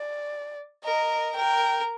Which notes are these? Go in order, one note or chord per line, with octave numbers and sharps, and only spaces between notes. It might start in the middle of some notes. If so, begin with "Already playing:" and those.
Already playing: D5
A#4 D#5
A#4 G5